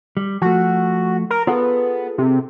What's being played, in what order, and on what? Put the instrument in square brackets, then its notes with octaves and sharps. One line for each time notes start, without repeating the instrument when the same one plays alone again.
[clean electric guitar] G3
[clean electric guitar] F3 A3 [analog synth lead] F#4
[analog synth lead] A#4
[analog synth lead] B3 [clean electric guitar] F4 G#4 A4
[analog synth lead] C3